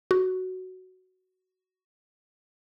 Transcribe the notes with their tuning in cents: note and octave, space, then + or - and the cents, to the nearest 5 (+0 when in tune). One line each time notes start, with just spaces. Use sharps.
F#4 +5